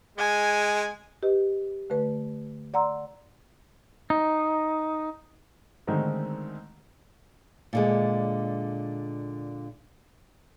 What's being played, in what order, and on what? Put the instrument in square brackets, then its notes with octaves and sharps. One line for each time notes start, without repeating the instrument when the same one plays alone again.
[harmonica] G#3 [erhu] G#5
[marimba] G4 B4 D#5
D3 A3 B4
D5 F#5 A#5 C6 E6
[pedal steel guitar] D#4
[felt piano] D3 D#3 G#3 A3 C4 D#4
[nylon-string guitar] A#2 D3 G#3